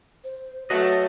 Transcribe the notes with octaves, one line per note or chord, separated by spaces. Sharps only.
C5
F#3 A3 B4 D#5